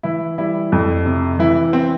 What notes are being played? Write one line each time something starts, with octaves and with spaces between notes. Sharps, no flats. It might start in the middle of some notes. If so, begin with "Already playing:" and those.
E3 E4
G3 E4
F2
C3
E3 E4
C4